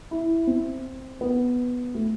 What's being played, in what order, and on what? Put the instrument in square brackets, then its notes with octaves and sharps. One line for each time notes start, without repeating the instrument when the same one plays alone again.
[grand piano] E4
C4
B3
A3